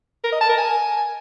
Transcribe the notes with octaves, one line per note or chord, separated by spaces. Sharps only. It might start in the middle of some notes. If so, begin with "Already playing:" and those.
A#4
D#5
A5
A#4
G#5